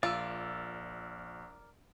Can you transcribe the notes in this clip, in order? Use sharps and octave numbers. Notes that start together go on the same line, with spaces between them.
A#1 F4 A#4 D5 E6